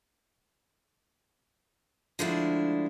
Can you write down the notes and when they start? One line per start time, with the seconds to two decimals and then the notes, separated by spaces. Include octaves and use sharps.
2.19 D3 F3 G#3 A3 D4 E4